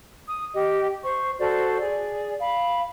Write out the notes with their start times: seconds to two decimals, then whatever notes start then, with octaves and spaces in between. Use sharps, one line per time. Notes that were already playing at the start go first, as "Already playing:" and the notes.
0.28 D#6
0.54 G4 D#5
1.03 C5 C#6
1.39 F#4 A4 C5 D5
1.80 G#4 D5
2.40 F5 B5